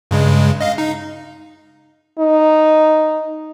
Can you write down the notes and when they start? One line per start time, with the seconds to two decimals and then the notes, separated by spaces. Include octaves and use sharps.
0.11 G2 C#3 G#3
0.61 D#5 F5
0.78 D#4
2.19 D#4